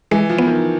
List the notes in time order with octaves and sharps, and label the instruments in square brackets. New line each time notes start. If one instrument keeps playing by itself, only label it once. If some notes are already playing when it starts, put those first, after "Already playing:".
[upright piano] E3 [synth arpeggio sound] G#3
[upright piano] F3
[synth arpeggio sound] B3
[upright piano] D#3